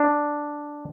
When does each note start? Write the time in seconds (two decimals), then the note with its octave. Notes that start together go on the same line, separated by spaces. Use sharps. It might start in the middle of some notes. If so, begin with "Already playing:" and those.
Already playing: D4